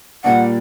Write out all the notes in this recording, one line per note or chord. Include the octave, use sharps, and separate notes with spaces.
A#2 G3 A#3 D4 F#5